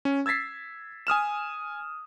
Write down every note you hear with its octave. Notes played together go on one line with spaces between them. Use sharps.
C#4
E6 G#6 A6 B6 C7
G#5 D#6 F6 E7